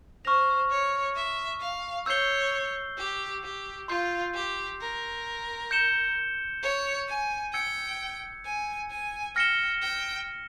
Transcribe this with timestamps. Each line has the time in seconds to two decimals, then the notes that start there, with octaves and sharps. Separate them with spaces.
0.25 C5 C#6 F6 A#6 F7
0.70 C#5
1.15 E5
1.60 F5
2.06 C#5 E6 G6 C7 G7
2.98 G4
3.43 G4
3.88 F4 C6 G6 C7
4.34 G4
4.80 A#4
5.71 G6 C#7 E7 G7
6.63 C#5
7.08 G#5
7.53 G5 E6 G#6 C#7
8.45 G#5
8.90 G#5
9.35 G5 F6 A#6 C#7 E7 G7
9.82 G5